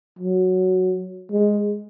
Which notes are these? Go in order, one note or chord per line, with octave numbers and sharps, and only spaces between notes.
F#3
G#3